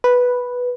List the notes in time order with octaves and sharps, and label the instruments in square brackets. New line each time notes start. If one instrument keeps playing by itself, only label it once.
[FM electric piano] B4